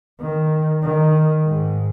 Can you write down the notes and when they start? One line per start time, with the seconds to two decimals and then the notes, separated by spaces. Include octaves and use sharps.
0.20 D#3
0.83 D#3
1.45 G#2